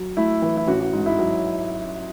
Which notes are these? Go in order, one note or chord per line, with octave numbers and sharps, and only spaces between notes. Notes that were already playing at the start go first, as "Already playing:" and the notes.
Already playing: F#3
A3 E4
E3
E4
A1 F#4
F#4
G#2
E4
F#3